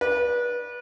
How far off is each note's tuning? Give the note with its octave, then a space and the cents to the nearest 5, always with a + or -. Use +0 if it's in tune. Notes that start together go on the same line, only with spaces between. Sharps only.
B4 -30 D5 +0